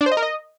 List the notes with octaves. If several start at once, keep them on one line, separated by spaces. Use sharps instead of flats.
D4
C5
D#5
A#4
D#5